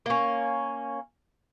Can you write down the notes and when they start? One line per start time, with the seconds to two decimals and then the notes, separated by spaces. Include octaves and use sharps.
0.06 A#3 C#4